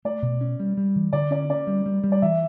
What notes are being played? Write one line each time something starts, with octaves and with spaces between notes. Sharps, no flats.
A3 D5
B2
C#4
G3
G3
E3
D3 D5
C#4 D5
C#4 D5
G3
G3
G3
D5
E3 E5